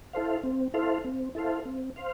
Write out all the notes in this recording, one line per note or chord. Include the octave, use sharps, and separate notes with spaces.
E4 A4 C5 F5
C4
E4 A4 C5 F5
C4
E4 A4 C5 F5
C4
C5 F5